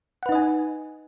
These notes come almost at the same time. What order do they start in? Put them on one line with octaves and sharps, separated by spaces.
F#5 B4 D#4 D#5 G#5